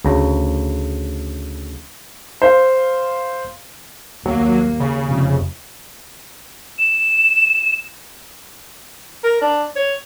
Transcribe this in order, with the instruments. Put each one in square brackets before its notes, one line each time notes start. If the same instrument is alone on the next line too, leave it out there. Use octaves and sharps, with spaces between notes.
[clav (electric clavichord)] D2 C#3 A#5
[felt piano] C5 F5
[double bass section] D#2 A#3 [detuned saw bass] F#3
[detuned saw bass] C#3
[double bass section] F1
[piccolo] E7
[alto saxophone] A#4
D4
C#5